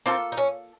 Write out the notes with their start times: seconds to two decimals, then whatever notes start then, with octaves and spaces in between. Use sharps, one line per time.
0.06 A#3 C4 F4 A4
0.32 D#4
0.37 C#4